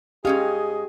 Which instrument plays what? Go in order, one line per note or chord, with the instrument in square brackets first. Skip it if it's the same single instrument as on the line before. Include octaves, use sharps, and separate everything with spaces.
[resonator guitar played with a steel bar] G#2 C#4 F5 [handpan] G4 [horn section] G#4 D#5